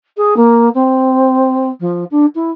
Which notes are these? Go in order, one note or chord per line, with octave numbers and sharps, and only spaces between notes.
G#4
A#3
C4
F3
D4
E4